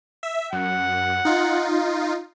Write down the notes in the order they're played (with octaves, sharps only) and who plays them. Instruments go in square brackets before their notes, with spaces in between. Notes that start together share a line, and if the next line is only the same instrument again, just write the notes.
[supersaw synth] E5
[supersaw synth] F#2 [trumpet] F#5
[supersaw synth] D#4 F4